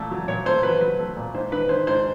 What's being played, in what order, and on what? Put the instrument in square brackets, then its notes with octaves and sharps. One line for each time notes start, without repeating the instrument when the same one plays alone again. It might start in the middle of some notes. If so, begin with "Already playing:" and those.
Already playing: [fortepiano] A#2 A3
F#3
A#2 C#5
A3 C5
F#3 B4
F#3 B4
A3
A#2
G#2 C5
D#3 B4
D#3 C5
G#2 C5